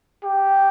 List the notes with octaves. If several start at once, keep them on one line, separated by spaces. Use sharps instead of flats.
G4